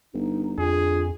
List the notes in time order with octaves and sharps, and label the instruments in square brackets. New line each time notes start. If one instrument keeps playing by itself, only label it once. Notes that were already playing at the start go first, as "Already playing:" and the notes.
[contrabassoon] G1 [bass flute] D#4
[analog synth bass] F2 [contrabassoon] D3 [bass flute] F4 [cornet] G#4